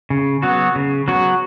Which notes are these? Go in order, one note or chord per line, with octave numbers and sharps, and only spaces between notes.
C#3
F#3 B3 F#4
C#3
F#3 B3 F#4